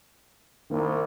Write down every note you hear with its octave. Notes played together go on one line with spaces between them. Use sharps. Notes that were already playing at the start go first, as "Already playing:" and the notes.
C2 D#3 A#3